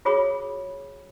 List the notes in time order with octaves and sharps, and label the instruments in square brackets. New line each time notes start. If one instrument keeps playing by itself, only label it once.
[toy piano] F4 F#4 G#4 C#5 B5 D#6